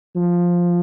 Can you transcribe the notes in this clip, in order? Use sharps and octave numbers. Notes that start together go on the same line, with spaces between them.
F3